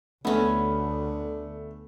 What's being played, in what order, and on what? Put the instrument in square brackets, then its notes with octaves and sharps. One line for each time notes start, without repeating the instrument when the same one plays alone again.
[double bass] D2 [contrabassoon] D3 [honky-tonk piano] A3 [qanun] B3 C#4